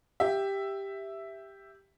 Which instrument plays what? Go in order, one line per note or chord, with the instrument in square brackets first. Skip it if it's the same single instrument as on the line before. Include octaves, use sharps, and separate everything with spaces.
[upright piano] G4 E5